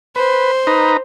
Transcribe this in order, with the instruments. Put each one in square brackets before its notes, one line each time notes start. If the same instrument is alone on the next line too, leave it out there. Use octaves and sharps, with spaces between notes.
[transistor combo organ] B4 [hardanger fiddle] C5
[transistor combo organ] D#4 B4 A#5